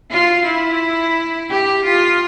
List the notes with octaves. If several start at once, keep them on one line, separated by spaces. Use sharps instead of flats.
F4
E4
G4
F4